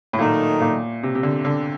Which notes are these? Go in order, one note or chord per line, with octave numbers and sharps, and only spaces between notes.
A2
A#2 D#3 F#3 A3 D#4
A#2
C3
C3
D3
D3